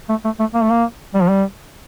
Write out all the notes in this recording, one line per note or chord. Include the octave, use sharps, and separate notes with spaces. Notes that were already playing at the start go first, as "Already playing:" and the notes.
A3
A3
A3
A#3
A3
A#3
G3
F3
G3